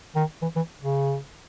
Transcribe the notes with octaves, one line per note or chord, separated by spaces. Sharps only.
D#3
E3
E3
C#3